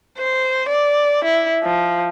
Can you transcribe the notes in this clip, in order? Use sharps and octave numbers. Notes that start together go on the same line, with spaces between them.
C5
D5
E4
F3